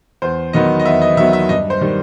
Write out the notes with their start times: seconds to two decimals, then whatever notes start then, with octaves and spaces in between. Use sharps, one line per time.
0.22 E2 C5
0.53 D#3 F#3 B3 D#5
0.80 D#5
0.85 E2 E5
1.02 D#5
1.17 D#3 E5
1.20 F#3 B3
1.33 E5
1.49 G2 D#5
1.70 C5
1.81 D#3 G3